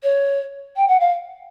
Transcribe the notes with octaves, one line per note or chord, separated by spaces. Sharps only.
C#5
G5
F#5
F5